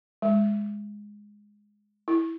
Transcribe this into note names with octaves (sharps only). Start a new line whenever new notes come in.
G#3
E4